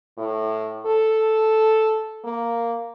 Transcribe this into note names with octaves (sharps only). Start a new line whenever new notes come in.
A2
A4
A#3